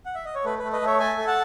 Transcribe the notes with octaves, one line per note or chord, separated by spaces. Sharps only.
F#5
E5
D#5
C#5
A3 B4
A3 B4
B4 D#5
A3 C#5 E5
A4 E5 G#5
A4
F#5 A5